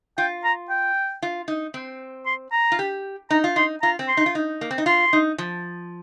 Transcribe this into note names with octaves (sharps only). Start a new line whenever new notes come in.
F4 G5
A#5
G5
F4
D#4
C4
C6
A#5
F4
G4
D#4 A#5
F4
D#4 C6
F4 A#5
C4
C6
D#4
F4
D#4
A#3
C4
D#4
F4 C6
D#4
F3